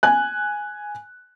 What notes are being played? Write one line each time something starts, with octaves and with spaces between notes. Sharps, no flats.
G#5 F#6